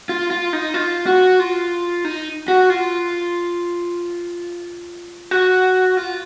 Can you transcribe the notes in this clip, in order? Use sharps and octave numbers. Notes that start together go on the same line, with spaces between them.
F4
F4
D#4
F4
F#4
F4
D#4
F#4
F4
F#4
F4